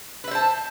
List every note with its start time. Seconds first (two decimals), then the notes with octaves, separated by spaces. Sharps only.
0.24 B4
0.28 E5
0.31 C5
0.35 A5